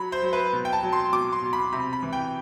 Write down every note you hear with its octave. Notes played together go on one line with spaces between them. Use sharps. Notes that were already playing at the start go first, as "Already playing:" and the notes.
Already playing: F#3 B5
C5
F#3
B4
B2
G5
A5
F#3
C6
B2 D6
C6
B2
B5
C3 B5
B5
E3
G5